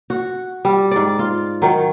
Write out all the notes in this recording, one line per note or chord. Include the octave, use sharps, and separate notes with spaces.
F#4 F#5
G3
G#2 D5
F4
D#3 F#3